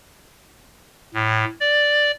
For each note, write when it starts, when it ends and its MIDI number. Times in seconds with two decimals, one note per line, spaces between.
1.14 1.45 45
1.60 2.11 74